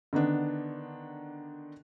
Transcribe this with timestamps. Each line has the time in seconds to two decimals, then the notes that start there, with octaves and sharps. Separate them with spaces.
0.13 D3 D#3 B3 D4